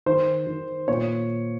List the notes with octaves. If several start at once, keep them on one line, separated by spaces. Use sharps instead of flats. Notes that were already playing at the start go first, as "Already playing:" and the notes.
D#3 C5
D#3
A#2 C#5